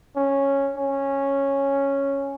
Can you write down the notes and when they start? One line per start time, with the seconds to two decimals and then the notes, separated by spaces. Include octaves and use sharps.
0.16 C#4
0.76 C#4